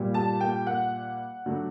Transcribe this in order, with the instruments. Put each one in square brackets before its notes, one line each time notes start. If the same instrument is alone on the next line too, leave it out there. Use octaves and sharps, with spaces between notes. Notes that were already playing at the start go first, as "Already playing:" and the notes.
Already playing: [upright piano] A#2 G3
A5
G5
F#5
D3 F#3 A3